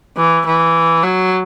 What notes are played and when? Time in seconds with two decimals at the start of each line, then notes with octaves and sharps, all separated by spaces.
0.17 E3
0.46 E3
1.03 F#3